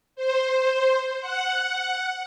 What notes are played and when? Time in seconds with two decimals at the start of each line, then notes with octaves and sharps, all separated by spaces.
0.16 C5
1.20 F#5